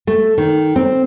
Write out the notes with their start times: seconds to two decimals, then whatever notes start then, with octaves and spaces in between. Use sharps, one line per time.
0.07 A3
0.38 D#3
0.76 C4